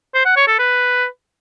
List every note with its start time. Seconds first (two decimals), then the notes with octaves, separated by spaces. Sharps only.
0.14 C5
0.25 F#5
0.36 C#5
0.47 A4
0.59 B4